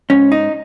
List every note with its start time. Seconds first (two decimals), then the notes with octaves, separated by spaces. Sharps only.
0.10 G#2 C#4
0.32 D#4